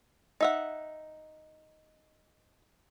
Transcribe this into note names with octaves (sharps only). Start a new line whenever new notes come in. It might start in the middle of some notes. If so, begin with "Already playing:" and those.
D#4 E5 F#5